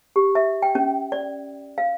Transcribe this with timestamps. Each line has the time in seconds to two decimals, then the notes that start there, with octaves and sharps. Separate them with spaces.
0.16 G4
0.35 E5
0.62 G5
0.75 C#4
1.12 D5
1.78 F5